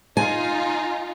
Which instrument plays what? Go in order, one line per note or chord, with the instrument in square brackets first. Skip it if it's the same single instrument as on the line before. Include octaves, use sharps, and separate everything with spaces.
[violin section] D#4 F4 [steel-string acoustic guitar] G#5